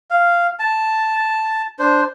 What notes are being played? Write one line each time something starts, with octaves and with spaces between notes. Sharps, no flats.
F5
A5
D4 C5